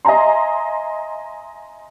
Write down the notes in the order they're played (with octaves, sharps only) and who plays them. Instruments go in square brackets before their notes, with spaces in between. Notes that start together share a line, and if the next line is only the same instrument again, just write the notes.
[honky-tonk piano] D#5 E5 G#5 A#5 C6